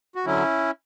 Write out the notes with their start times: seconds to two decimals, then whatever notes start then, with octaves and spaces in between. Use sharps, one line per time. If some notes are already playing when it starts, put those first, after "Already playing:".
0.15 F#4
0.26 D3 F#3 C#4 E4